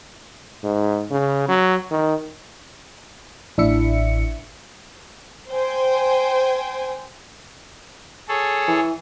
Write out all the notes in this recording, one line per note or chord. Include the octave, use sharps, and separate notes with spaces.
G#2
C#3
F#3
D#3
A1 D4 E4 E5 C#7
C5 G5 G#5
G#4 A4 C#5
E3